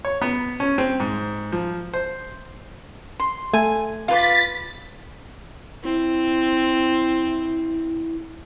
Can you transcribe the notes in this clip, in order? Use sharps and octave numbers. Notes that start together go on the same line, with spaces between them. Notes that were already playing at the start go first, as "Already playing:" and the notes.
C#5
B3
C#4
C4
G#2
F3
C5
C6
A3 G#5
F4 B4 F5 D6 A6 B6
C4 E4